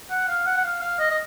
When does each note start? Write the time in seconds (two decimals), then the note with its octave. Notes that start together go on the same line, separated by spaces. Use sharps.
0.10 F#5
0.28 F5
0.46 F#5
0.57 F#5
0.65 F5
0.81 F5
1.00 D#5
1.11 D#5